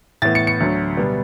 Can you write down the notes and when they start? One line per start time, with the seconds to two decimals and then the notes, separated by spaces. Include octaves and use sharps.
0.22 A2 E3 B3 A6
0.35 C#7
0.47 C#7
0.60 D2 D3 F#3
0.97 B2 G3 B3